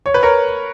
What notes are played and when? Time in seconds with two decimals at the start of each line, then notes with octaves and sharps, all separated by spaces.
0.06 C#5
0.14 B4
0.23 A#4 C#5